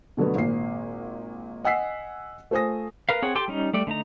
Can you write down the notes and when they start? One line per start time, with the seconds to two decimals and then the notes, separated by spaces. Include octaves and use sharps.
0.17 B2 D3 F#3 A3 B3
0.35 G#1 A#2 C7
1.64 D#5 F#5 G#5 E6 B6 C7
2.51 A3 F4 C5 G#5 D#6 A#6
3.09 A#4 B4 F5
3.22 C4 G#4 C#5 F#5
3.35 G4 A4 G5 C6 D6
3.48 G3 C#4 D#4
3.73 G3 A3 D5
3.87 D3 A3 D#4 A#5